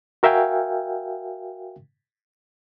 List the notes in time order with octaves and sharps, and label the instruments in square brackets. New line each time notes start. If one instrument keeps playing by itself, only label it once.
[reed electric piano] F#4 A#4 E5 F5 G5 G#5